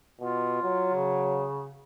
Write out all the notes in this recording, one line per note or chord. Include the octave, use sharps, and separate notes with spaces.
B2 F4
F#3
C#3